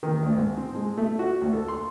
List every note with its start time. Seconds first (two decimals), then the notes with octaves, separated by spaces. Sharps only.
0.03 D#3
0.23 D2
0.37 G#2
0.57 C4
0.75 G#3
0.98 A3
1.19 F#4
1.42 D2
1.53 A4
1.68 C6